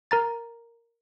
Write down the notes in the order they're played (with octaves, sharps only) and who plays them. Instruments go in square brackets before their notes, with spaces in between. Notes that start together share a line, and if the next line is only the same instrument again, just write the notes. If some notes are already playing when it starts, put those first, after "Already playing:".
[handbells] A#4 A#5 A6